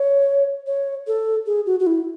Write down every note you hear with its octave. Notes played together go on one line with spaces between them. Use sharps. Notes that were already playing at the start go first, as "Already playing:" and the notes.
Already playing: C#5
C#5
A4
G#4
F#4
F#4
E4